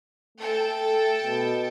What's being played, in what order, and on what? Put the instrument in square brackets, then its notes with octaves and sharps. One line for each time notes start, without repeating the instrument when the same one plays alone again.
[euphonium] A3 [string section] A4 G5 A5
[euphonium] B2